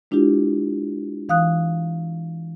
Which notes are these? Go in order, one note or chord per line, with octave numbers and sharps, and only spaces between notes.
G#3 D4 E4 F4 G4
E3 F5 D#6 F#6